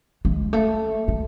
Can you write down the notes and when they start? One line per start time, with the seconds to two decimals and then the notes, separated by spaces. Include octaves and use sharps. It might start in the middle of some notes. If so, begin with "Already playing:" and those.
0.25 G#3
0.53 A3
1.08 G#3